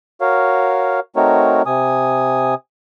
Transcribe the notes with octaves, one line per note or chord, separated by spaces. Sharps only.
F#4 A#4 C#5 F5
A3 C4 D#4 F#4 A#4 C#5
C3 G#5 D#6